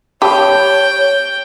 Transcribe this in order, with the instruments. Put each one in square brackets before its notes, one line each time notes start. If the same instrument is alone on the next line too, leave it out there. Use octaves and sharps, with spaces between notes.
[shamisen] G4 [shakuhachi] C#5 [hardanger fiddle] G5 [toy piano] A5 B5